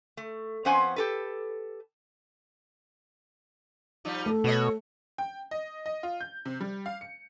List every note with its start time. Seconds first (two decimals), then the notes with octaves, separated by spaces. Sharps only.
0.17 A3
0.65 F2 B3 C#4 C5 F#5 G#5
0.96 G4 A4 B4
4.05 F3 G3 D#4
4.26 A3 A4
4.44 B2 F#4 C#5 D#5
5.18 G5
5.51 D#5
5.86 D#5
6.03 F4
6.20 G6
6.45 C3
6.61 G3
6.86 F5
7.01 C#7